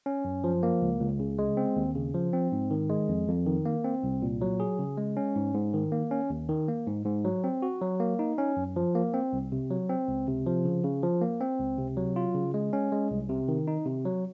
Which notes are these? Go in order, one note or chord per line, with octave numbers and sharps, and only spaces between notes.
C#4
F#2
F3
A#3
C#2
C#2
C#3
G#3
C4
D#2
C#3
F3
C4
G#2
D#3
G#3
F2
F2
D#3
A#3
C4
C2
A#2
F#3
G#4
C#3
G#3
C#4
G#2
G#2
D#3
A#3
C#4
D#2
D#3
A#3
G#2
G#2
F#3
C4
F#4
F#3
A#3
D#4
C#4
F#2
F3
A#3
C4
C2
C3
F#3
C4
C#2
C3
F3
C#3
C#3
F3
A#3
C4
C#2
C3
F#3
F4
C#3
G#3
C#4
G#3
C2
C3
D#3
D#4
C3
F#3